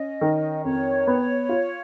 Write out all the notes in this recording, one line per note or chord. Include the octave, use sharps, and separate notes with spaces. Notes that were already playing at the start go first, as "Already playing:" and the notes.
Already playing: C#4 D#5
D#3
F2 C#5
B3
F4